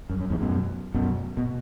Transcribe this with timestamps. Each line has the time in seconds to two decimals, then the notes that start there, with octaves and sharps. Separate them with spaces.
0.10 F#2
0.20 F#2
0.30 E2 G#2
0.41 F#2 B2
0.94 F#2 B2
1.37 B2